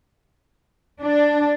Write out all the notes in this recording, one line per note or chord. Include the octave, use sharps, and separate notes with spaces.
D4